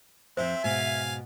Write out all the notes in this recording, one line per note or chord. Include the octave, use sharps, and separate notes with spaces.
F2 F3 C4 C5 E5
G#2 B2 F5 G#5